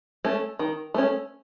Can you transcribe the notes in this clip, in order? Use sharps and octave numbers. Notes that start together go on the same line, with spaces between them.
A3 C#4
D#3
A3 C#4